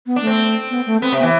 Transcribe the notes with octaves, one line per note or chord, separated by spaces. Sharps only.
B3
D4
A3
C4
B3
A3
B3 C4
C3
E3 B3